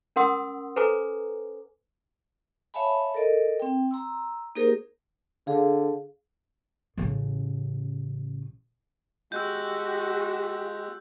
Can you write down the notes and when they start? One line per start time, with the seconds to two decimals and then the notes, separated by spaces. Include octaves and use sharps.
0.16 C#4 A#4 F#5 C6 D#6 E6
0.76 A4 B4 C5 G#5 A#5 D6
2.74 C#5 E5 F5 G#5 A5 B5
3.14 A4 A#4 D5 D#5
3.60 C4 G5
3.91 A#5 C6 E6
4.55 A#3 D#4 G4 G#4 A#4 C5
5.47 D3 G#4 F5
6.97 A1 C#3
9.32 G#3 F#4 G4 E6 F#6 G6